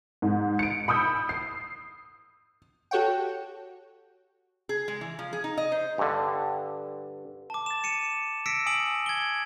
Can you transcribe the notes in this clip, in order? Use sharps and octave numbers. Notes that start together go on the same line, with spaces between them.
G#2
C#7 D7
B5 D#6 E6 G6
C7
F#4 G4 A4 C#5 F#5 G5
G#4
G#3
E3
F3
G#4
D#4
D#5
C5
G2 D3
A5 D6
A6 E7
C#7 D#7 E7
E6 A#6 B6 C#7 D7
G#5 D#6 D7 F#7
G#6 G7